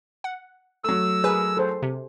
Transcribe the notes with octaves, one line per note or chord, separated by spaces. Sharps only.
F#5
F#3 A3 E6
G#4 A#4 B4
A4 C5
C3